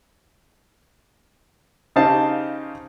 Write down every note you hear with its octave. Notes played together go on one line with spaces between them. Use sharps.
C#3 D#4 G4 C5 F5 A5